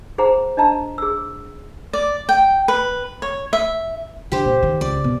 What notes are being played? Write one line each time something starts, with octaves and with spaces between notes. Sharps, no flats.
G#4 C5 F#5 A#5
D4 D#5 A5 A#5
G#4 E6
D5
G5
B4
C#5
E5
D3 G4 C5
A#2
D#3
C#2 D5
B2